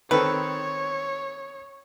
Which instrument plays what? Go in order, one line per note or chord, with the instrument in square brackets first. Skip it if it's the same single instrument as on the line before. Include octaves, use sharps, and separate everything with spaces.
[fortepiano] D#3 C4 A4 [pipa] B4 [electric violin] C#5